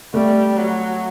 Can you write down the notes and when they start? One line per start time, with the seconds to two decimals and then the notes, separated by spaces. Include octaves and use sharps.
0.14 G3 A3
0.58 F#3